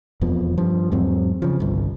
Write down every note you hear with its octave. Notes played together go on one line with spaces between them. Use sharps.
E1 F2 B2 F3
G2 F3
E2 G#2 F#3 C4
C#3 F3
G1 C2